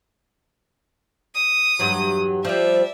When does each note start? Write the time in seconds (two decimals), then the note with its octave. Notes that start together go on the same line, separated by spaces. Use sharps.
1.35 D#6
1.79 E2 G2 F#3
2.45 F3 G3 D5 E5